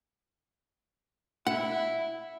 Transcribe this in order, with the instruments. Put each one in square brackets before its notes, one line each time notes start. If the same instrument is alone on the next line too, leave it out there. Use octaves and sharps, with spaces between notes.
[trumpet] E4 [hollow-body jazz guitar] F#5